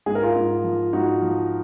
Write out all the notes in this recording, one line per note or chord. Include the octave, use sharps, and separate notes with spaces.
G#2 G#4
A#4
F4 G#4
G#2
F3
G#2 D#4 F#4
F3